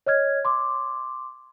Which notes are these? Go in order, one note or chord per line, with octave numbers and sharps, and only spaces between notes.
C#5 D#5 F6 G#6
C6 D6